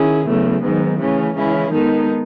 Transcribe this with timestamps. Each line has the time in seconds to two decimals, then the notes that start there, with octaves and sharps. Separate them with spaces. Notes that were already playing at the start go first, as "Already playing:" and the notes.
Already playing: D#3 C#4 E4 G#4
0.26 E2 C#3 F#3 A3
0.62 G#2 D#3 F#3 B3
0.99 C#3 E3 A3 C#4
1.35 C#3 E3 G#3 C#4 E4
1.72 D#3 G#3 B3 D#4 A4